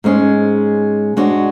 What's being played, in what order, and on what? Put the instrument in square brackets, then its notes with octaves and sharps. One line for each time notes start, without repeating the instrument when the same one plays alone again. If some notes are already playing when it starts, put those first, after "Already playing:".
[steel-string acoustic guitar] G#2 G#3 C#4 G#4
G#2 G#3 D4 F#4 C#5